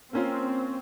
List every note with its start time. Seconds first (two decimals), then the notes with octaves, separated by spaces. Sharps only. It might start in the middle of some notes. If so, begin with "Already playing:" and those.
0.13 A#3 C4 C#4 F4